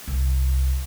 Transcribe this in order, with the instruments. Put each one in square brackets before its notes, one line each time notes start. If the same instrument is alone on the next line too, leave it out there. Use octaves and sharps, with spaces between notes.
[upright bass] C2